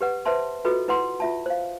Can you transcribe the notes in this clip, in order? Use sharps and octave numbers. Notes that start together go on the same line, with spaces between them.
G4 B4 F#5
B4 C5 E5 A5 C6
F4 F#4 A4 B4 D#5
E4 B4 F#5 C6
F4 E5 A5
C5 F5